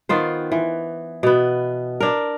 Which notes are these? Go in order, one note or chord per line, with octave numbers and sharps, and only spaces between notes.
D#3 B3 F4 C5
E3
B2 B3
D4 A#4